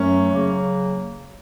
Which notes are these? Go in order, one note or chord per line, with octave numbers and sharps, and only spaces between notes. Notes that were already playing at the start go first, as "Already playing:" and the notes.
Already playing: F#2 F#3 A3 C#4
C#3 F#3 A#3